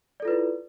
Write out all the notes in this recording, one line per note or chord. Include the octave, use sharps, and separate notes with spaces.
E4 F4 A4 B4 D5